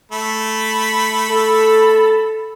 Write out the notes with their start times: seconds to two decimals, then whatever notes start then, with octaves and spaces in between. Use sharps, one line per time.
0.12 A3 B5
1.28 A4